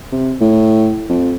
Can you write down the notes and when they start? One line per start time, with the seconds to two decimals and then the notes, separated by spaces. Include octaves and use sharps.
0.12 C3
0.41 A2
1.10 F2